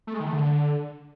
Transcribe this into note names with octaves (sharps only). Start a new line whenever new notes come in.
A3
G#3
D#3
A3
D3